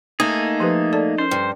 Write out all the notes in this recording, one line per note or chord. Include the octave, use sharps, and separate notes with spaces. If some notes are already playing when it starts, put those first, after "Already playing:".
A3 A#3 D#4 G#4
F3 G4 B4
A4 D5 A5
C#4 A#4 C5
G2